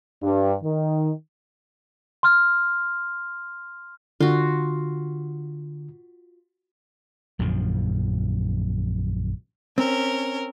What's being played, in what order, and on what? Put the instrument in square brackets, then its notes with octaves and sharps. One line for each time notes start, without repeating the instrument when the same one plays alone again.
[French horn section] G2
D#3
[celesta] C6 F6
[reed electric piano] D3 [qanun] F4 F#4
[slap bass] A#1 F#2 D3 F3
[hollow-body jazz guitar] C4 [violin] C#4 A#4